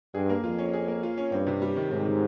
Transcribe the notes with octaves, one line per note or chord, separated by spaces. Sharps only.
G2 G#4
A#3
F2 F4
C#4
G#4
A#3
F4
C#4
G2 C4
C3
G3
D#3
G#2 C4
C3